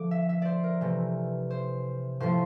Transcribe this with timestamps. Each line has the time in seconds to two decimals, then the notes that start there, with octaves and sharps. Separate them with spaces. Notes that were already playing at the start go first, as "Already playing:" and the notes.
Already playing: D3 F3 A3 D6
0.11 E5
0.29 E5
0.42 C5 D5
0.64 A#4
0.81 C3 E3 A3
1.50 C5
2.20 A2 F3 A3 C5